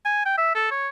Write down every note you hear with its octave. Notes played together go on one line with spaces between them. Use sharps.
G#5
G5
E5
A4
C#5